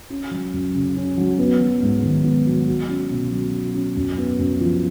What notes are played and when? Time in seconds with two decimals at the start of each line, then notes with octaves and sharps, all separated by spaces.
0.10 C#4
0.31 F#3
0.53 F#2
0.74 C#3
0.96 C#4
1.18 F#3
1.38 B3
1.61 F#3
1.82 G#2
2.03 D#3
2.24 B3
2.46 F#3
2.67 F#4
2.89 C#4
3.11 B2
3.32 F#3
3.53 F#4
3.74 C#4
3.96 F#2
4.18 B3
4.39 F#2
4.61 F3